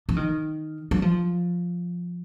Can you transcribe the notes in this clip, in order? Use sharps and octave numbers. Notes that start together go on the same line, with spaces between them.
F3
D#3
F#3
F3